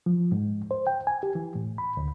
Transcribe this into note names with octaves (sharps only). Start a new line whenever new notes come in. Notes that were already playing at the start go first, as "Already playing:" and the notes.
F3
G#2
C5
G5
G#5
G4
E3
A2
B5
D2